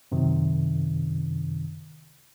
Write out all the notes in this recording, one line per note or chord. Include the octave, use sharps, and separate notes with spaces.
F#2 C3 D#3